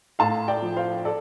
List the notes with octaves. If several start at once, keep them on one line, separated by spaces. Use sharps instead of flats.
A2 F5 A5
D5 G5
F3
C5 F5
A4 D5